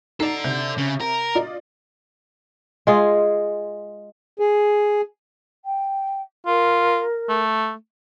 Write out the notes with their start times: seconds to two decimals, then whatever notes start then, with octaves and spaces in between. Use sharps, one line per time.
0.20 D#4 A4 D5 A#5 C7
0.44 C3 G6
0.78 C#3
1.01 A#4
1.35 F4 D5 D#5
2.87 G#3 F4 G#4
4.39 G#4
5.65 G5
6.46 F4 A#4
7.29 A3